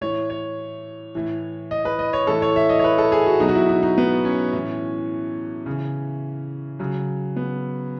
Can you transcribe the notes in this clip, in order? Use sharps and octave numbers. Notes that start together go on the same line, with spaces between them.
A2 E3 C#5
C#5
A2 E3
D#5
B4
D#5
C#5
A2 E3 A4
C#5
E5
D#5
C#5
B4
A4
G#4
F#4
B2 F#3 D#4
F#4
E4
D#4
D#4
B3
C#4
A2 E3
C#3 E3
C#3 F#3
B3